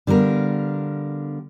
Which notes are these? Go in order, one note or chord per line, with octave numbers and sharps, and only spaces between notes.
D3 G3 B3 A#4 F5